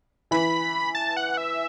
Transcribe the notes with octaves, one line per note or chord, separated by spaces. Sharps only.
E3 B5
A5
F#5
E5